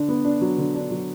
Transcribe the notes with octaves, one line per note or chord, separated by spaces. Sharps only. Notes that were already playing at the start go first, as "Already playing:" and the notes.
Already playing: D3 D4
B3
D4
F#3
D3
D4
F#3